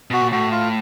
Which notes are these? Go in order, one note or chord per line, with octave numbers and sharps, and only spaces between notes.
B2 F#4
A#2
A2 F#4
F4